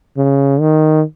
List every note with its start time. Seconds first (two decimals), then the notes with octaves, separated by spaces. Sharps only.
0.17 C#3
0.61 D#3